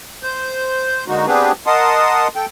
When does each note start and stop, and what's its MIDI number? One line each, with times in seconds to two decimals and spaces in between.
0.23 1.05 72
0.23 1.05 91
1.08 1.26 50
1.08 1.26 56
1.08 1.26 58
1.08 1.26 63
1.08 1.26 66
1.27 1.52 59
1.27 1.52 60
1.27 1.52 62
1.27 1.52 67
1.27 1.52 68
1.27 1.52 71
1.67 2.28 70
1.67 2.28 75
1.67 2.28 78
1.67 2.28 81
1.67 2.28 84
1.67 2.28 87
2.36 2.46 69
2.36 2.46 79